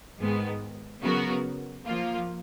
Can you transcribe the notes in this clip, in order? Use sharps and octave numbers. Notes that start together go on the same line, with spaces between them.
G#2 D#3 G#3 B3
C#3 F#3 B3 F#4 A#4
F3 A#3 F4